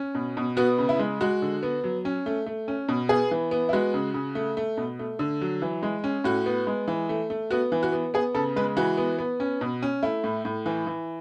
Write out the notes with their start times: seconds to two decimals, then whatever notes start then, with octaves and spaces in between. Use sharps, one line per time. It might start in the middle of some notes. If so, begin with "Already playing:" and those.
Already playing: C#4
0.15 B2
0.37 B2
0.57 B3 F#4
0.78 C#3
0.89 E4
0.99 G#3
1.21 G#3 F#4
1.42 D3
1.63 B3
1.84 F#3
2.05 C#4
2.26 A3
2.46 A3
2.68 C#4
2.89 B2
3.09 B3 G#4
3.31 E3
3.51 B3
3.69 E4
3.73 G#3 F#4
3.94 C#3
4.14 C#3
4.35 A3
4.57 A3
4.77 B2
4.99 A3
5.19 D3
5.41 F#3
5.62 E3
5.83 G#3
6.04 C#4
6.24 A2 F#4
6.46 B3
6.67 G#3
6.88 E3
7.09 A3
7.30 A3
7.51 B3 F#4
7.72 E3
7.83 F#4
7.93 B3
8.14 B3 G#4
8.34 C#3 A4
8.56 G#3 B4
8.77 E3 F#4
8.98 B3
9.19 B3
9.40 C#4
9.61 B2
9.82 C#4
10.03 A3 E4
10.24 A2
10.45 A2
10.66 E3
10.87 E3